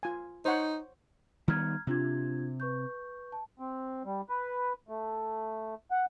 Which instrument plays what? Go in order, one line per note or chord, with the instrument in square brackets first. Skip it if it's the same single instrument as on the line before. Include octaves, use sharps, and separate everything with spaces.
[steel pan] F4 G#5
[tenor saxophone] D#4 [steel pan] C5 C#5 F#5
[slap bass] D#3 G3 B3 [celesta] A#5 F6 G#6
[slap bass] C3 [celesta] D4 F4 G#6
[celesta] B4 C#6 G6
A5
[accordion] C4
G3
B4
A3
F#5